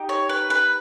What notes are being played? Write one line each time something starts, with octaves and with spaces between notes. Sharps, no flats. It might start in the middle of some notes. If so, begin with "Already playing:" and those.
Already playing: D#4 G4
C#5
B4
B4